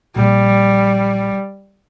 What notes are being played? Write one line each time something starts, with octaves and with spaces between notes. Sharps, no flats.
A#1 G3